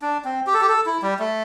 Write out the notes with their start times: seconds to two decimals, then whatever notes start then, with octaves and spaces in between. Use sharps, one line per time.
0.02 D4
0.25 C4
0.47 G4
0.54 A4
0.61 G4
0.69 A4
0.86 E4
1.02 G3
1.19 A3